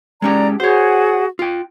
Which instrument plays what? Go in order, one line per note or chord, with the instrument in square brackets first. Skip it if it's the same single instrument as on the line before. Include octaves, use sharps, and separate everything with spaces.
[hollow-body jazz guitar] G#3 C#4 G4 [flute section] D5 A#5
[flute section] F#4 G#4 F#5 [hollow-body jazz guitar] C5 C#5
[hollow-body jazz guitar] F4 G5